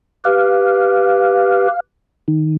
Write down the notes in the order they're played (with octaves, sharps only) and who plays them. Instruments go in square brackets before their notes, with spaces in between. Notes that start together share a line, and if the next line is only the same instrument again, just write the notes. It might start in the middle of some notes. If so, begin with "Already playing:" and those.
[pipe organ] G4 B4 [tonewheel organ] F5
[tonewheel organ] D#3